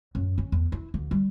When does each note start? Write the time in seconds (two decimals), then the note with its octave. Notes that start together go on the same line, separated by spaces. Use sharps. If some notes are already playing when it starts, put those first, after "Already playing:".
0.15 F#2
0.38 C#4
0.52 E2
0.72 E4
0.94 D2
1.11 G3